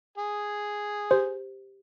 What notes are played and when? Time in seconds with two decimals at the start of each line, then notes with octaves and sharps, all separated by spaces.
0.18 G#4
1.11 G4 C5